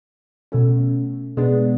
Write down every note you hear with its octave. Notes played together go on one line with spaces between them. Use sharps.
B2 A3 C#4
B2 G#3 B3 D4